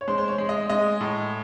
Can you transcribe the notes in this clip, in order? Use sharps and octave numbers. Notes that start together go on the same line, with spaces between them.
C#5
G#3 C5
C5
C#5
G#3
D#5
G#3 D#5
A2